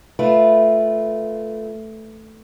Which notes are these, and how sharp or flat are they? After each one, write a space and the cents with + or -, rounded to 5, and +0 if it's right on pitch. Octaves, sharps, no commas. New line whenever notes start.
A3 +0 F4 +0 B4 +0